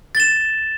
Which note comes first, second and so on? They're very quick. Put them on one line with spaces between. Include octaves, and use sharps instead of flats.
A6 G7 E7